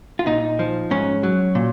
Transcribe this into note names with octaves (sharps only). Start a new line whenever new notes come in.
F4
A#2 D#4
F3
G#2 C#4
F#3
A#2